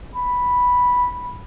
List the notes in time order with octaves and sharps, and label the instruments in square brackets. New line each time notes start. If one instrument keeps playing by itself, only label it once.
[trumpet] B5